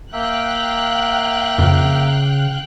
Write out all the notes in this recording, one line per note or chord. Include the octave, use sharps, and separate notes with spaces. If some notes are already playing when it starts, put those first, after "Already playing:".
A#3 E5 F5 G5 F#6
F2 C#3